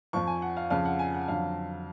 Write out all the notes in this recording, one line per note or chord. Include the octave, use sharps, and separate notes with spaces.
F2 F3 C#6
G#5
F#5
F5
F2 C#3 F3 F5
F#5
G#5
F#5
F2 D3 F#3 F5